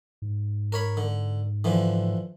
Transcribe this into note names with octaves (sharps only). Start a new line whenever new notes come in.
G#2
A#4 C#5 B5
D3
D3 E3 F3